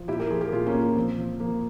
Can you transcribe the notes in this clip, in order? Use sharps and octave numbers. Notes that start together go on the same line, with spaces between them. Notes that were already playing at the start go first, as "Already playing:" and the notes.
Already playing: F3
A#2 E4 G4
G4 A#4
F3 F4 G#4
G4 A#4
A#2 F4 G#4
A#3 C#4
A#2
A#3
F3 C4
F3
F3 A#3